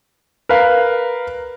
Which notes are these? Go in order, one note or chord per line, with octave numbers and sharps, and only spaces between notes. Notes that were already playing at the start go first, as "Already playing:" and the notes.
A#4 B4 F5